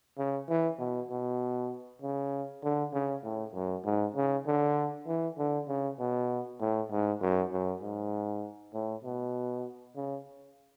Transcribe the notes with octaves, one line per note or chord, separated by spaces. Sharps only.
C#3
E3
B2
B2
C#3
D3
C#3
A2
F#2
G#2
C#3
D3
E3
D3
C#3
B2
A2
G#2
F#2
F#2
G#2
A2
B2
C#3